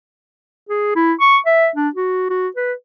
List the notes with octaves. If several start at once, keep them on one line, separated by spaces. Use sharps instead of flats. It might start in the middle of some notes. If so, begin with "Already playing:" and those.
G#4
E4
C#6
E5
D4
F#4
F#4
B4